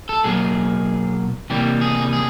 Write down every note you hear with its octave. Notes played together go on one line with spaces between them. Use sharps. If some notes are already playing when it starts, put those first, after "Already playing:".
A4
B2 F#3 A#3 G#4
C3 E3 G3 A#3 G4
G#4
G#4